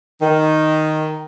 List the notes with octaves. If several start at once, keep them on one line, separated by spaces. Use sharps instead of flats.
D#3